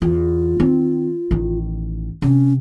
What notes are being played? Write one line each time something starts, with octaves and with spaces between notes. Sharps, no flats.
E2 F4
D#3 C4
A1 D#3
C3 C#4